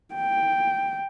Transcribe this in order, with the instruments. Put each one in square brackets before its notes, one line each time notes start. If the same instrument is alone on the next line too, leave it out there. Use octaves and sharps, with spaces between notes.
[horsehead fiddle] G5